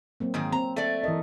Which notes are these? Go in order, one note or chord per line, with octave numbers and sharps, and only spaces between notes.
F#3 A#3 C4
G#2 D#3 G#3
C4 A#5
A3 D5
E3 A#4 D#5